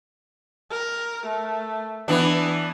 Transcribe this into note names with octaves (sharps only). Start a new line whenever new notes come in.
A#4
A3
E3 B3 D4